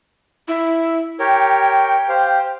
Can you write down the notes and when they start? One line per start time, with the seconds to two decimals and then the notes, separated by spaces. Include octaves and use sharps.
0.48 E4
1.20 G4 A#4 C#5 G5
2.09 G4 C5 F5